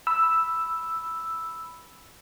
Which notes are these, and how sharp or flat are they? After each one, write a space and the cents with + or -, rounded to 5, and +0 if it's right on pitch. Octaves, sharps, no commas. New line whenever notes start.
B5 +0 E6 +0